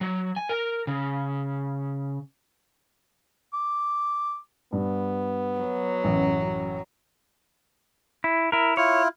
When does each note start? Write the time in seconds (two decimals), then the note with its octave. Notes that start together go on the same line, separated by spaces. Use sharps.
0.01 F#3
0.36 G#5
0.49 A#4
0.87 C#3
3.53 D6
4.72 G2 B3
5.59 F#3
6.04 A1 F#2
8.24 E4
8.52 E4 A#4
8.77 E4 F4 C#5